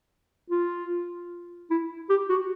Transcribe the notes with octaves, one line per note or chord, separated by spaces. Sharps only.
F4
E4
G4
F#4